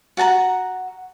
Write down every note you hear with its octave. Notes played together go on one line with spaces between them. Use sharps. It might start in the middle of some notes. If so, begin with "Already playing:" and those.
F#4 F#5 A5 A#5